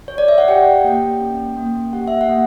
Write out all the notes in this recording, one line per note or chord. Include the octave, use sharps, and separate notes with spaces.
C#5
D5
E5
F#5
G4 G5
A#3
C#4
A#3
G4 F#5
E5
F#5
A#3